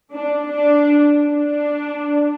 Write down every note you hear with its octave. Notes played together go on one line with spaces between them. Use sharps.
D4
D4
D4